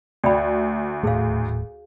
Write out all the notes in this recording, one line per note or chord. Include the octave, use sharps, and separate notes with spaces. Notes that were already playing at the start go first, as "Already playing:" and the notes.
D2 D5 G5 B5
D#1 A2 A3 G#4 F5